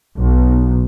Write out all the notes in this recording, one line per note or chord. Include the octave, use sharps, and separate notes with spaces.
B1